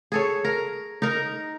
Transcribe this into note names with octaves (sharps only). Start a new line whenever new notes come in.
G#4 A4 C#5
A#4
D#4 A#4